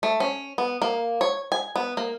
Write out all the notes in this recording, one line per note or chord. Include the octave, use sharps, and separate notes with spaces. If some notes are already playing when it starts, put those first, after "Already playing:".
A3
C#4
B3
A#3
C#5
G#5
B3
A#3